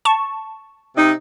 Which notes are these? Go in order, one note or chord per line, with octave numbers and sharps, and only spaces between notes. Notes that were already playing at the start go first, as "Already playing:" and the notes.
A5 C#6
C3 D#4